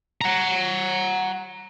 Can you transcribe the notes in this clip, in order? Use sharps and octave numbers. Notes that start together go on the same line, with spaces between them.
F#5 A#5